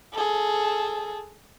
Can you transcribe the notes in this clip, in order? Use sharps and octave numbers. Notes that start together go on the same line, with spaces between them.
G#4 A4